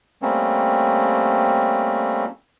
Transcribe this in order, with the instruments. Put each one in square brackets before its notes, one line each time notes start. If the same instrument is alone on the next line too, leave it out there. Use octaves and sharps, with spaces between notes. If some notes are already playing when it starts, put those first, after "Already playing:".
[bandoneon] G3 A3 A#3 C4 C#4